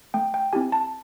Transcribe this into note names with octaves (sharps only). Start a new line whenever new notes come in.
A3 G5
G5
C4 E4 G4 G#5
A5